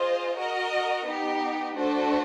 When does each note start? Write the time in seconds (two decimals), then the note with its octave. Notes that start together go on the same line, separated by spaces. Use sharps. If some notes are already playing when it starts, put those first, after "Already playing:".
Already playing: F4 G#4 C5 D#5
0.36 F#4 A#4 D#5
1.05 B3 D#4 G4
1.75 A3 D4 F#4 A4 C5